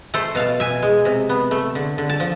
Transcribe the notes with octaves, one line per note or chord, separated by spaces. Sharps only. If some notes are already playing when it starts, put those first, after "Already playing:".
A3 A4 C5
B2 F5 A5
B2 E5 G#5
G#3
C3
B3
A3
D3
D3
A5
F3